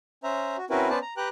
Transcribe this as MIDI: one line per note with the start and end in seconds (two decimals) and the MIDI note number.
0.24 0.56 61
0.24 0.56 72
0.24 0.56 76
0.24 0.56 82
0.57 0.65 66
0.70 0.90 60
0.70 0.90 61
0.70 0.90 64
0.70 0.90 66
0.70 0.90 70
0.70 0.90 71
0.90 0.99 59
0.90 0.99 61
0.90 0.99 71
0.90 0.99 72
0.90 0.99 74
0.90 0.99 81
1.02 1.14 82
1.17 1.29 67
1.17 1.29 71
1.17 1.29 79
1.17 1.29 82
1.17 1.29 90